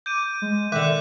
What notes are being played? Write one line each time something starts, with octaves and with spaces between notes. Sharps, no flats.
D6 G6 D#7
G#3
D3 D#3 E5 D6 F#6